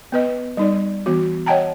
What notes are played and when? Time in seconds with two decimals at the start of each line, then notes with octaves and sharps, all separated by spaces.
0.12 B3 B4 D#5
0.57 G3 D#4 D5
1.06 E3 B3 F#4
1.46 C#5 D#5 F#5 G5 A5 A#5